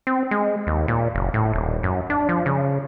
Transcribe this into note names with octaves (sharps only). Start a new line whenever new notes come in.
C4
G#3
D#2
A#2
F#1
A2
D#1
F#2
D4
F3
C#3